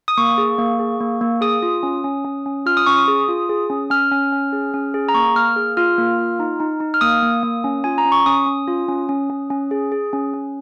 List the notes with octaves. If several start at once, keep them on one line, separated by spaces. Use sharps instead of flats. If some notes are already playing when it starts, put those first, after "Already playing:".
D#6
A#3 C#6
G#4
A#3
G#4
A#3
A#3
G#4 D#6
F4
C#4
C#4
C#4
C#4
F4 F6
D#6
C#4 C#6
D#6
G#4
F4
G#4
C#4
C#4 F6
C#4
C#4
G#4
C#4
G#4
A#5
A#3 C#6
A#3 F6
G#4
F4 F6
A#3
F4
D#4
D#4
D#4
F6
A#3 D#6
A#3
A#3
C#4
F4 G#5
A#5
C#4
C#6
C#4 D#6
C#4
F4
C#4
C#4
C#4
C#4
G#4
G#4
C#4
C#4